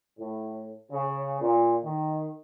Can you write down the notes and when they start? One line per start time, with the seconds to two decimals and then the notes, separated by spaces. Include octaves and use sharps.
0.18 A2
0.91 C#3
1.42 A#2
1.84 D#3